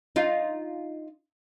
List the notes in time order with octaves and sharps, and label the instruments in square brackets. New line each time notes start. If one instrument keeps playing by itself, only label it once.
[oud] D#4 F4